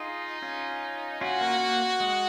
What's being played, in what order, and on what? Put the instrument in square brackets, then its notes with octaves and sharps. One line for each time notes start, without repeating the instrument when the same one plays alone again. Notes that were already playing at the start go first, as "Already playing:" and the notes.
Already playing: [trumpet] D#4 [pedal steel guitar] F4 G#4
[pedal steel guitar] C#4 F4
[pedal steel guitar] C#4 F4 [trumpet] F#4
[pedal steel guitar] A#3
A#3
G#3